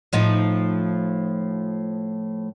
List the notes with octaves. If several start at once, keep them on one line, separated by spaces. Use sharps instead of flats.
A2 F3 D#4